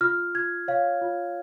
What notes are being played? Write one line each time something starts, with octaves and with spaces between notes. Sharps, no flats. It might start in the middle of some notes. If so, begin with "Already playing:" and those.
F4 F6
F4 G#6
C#5 F5
F4